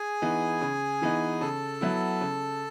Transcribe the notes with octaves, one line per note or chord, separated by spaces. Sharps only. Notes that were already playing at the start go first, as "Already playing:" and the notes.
Already playing: G#4 G#5
E3 B3 D#4
C#3
E3 B3 D#4
C#3 A4 A5
F#3 B3 E4
C#3